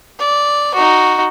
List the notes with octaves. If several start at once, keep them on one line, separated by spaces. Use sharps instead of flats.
D5
D#4 F#4